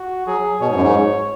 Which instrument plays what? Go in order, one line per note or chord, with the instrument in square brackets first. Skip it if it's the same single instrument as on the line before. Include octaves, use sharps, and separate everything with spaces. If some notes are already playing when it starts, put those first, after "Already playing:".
Already playing: [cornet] F#4
[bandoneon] F#3 [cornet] G#4
[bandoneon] B2 [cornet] C#5
[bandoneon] G#2
F#2
G#2